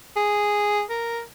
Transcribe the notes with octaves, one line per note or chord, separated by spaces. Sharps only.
G#4
A#4